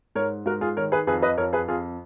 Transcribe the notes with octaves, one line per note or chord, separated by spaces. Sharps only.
G#2 A#4 C#5
G#2 F#4 A#4
F4 G#4
D#3 A#4 C#5
G#4 B4
F2 G#4 B4
B4 D#5
F2 A#4 C#5
G#4 B4
F2 F4 G#4